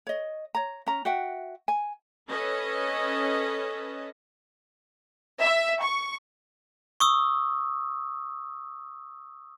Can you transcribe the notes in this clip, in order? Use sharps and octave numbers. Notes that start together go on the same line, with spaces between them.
C#5 D#5
C#5 A#5
C#4 A#5
F#4 E5 F#5 G5
G#5
C#4 A4 B4 D#5
E5
C#6
C#6 D#6 E6